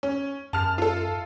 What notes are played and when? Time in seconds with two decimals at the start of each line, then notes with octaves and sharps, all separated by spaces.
0.03 C#4
0.53 F#2 A5 F6
0.78 F4 A4